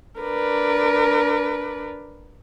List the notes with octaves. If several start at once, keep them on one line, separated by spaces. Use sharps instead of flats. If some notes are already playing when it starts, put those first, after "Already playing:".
D4 A#4 B4 D5